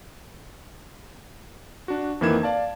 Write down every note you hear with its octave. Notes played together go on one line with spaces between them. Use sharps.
D4 F#4
F2 D#3 E3 A#3 G#6 E7
D5 F5 A5